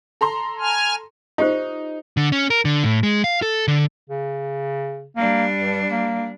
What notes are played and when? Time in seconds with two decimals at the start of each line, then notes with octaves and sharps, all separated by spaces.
0.21 A4 A#5 C6
0.60 G#5 F6
1.38 D#4 F4 G4 C5
2.17 D3
2.32 C#4
2.50 A#4
2.65 D3
2.84 A2
3.03 G#3
3.24 F5
3.42 A4
3.68 D3
4.10 C#3
5.17 G3 A#3 D4
5.57 G2
5.91 A#3